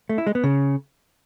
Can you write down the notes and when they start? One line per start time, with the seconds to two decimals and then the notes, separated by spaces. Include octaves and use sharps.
0.09 A3
0.18 E4
0.27 G#3
0.35 B3
0.44 C#3